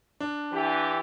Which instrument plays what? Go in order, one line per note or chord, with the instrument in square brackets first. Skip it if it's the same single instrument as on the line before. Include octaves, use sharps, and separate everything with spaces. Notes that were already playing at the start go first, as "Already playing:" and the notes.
[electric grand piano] D4
[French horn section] D3 E3 G4